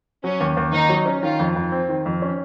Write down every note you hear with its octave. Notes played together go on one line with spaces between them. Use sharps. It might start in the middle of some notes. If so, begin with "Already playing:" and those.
F#3 C#4
D#2
D#2
D#2 D#4
F#3
C#4
D#3 F4
F2
F2
C4
D#3
F2
C#4